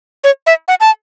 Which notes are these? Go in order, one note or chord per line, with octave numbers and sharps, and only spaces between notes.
C#5
E5
F#5
A5